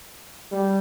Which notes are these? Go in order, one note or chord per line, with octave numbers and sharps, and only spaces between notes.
G3